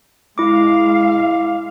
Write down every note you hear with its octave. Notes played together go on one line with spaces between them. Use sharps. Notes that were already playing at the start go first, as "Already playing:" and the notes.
G#3 E4 F5 D6